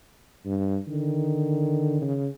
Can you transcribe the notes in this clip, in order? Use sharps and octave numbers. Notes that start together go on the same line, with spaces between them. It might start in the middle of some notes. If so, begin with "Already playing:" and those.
G2
D3 D#3
C#3